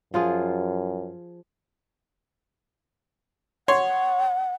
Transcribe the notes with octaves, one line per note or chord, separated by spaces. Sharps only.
F#2 F3 F4 G#4
C#5 F#5 C6